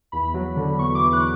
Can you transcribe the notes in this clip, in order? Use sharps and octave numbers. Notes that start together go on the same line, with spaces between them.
E2 B5
F#3
D3
E2 C#6
D6
E2
F#6